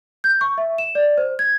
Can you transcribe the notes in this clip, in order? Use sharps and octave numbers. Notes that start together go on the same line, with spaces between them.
G6
C#6
E5
E7
D5
C5
G#6